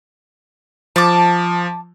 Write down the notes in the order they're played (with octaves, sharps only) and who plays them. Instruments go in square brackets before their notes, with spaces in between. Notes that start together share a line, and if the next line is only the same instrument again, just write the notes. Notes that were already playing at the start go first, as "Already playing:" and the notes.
[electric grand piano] F3 [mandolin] A5 D6